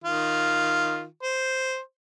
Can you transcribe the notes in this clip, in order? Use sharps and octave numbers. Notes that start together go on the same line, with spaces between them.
D#3 F4
C5